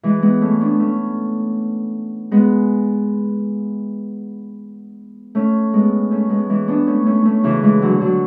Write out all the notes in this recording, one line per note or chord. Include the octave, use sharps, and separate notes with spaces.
E3 G#3
G#3 B3
A3 C#4
B3 D4
A3 C#4
G#3 B3
A3 C#4
G#3 B3
A3 C#4
G#3 B3
E3 G#3
B3 D4
A3 C#4
A3 C#4
A3 C#4
C#3 E3
E3 G#3
D3 F#3
D3 F#3